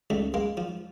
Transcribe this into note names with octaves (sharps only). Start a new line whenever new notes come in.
C#2 A3
G#3 A#3
F3